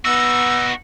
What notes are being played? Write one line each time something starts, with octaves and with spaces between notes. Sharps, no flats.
B3 D#4 F#4 E6